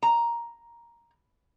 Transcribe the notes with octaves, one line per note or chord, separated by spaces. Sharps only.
A#5